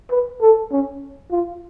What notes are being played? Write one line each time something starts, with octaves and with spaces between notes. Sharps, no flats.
B4
A4
C#4
F4